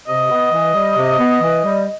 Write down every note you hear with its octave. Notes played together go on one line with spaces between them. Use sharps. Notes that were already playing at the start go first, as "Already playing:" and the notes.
C3 D#5
B3
E3
G3
C3
B3
E3
G3